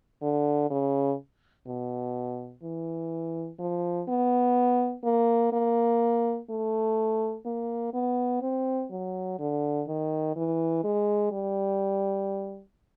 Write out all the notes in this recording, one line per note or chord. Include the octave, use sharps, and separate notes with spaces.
D3
C#3
B2
E3
F3
B3
A#3
A#3
A3
A#3
B3
C4
F#3
D3
D#3
E3
G#3
G3